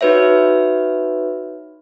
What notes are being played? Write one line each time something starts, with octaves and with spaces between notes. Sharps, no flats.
D#4 F#4 B4 C#5 E5